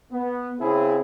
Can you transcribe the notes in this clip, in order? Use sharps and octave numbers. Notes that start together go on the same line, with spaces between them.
B3
C#3 C4 E4 G#4